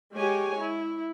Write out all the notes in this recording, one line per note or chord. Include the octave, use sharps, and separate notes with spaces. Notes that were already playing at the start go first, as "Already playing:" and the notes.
G#3 G4 C#5 G#5
E4